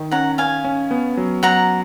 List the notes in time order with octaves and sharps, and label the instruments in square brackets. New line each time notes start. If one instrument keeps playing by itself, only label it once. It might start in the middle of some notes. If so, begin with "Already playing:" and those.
Already playing: [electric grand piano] D#3
[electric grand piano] C#4 [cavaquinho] F#5 A#5
[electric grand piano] C#4 [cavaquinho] F5 G#5
[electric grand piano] C#4
B3
F#3
[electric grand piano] F#3 [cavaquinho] F#5 A#5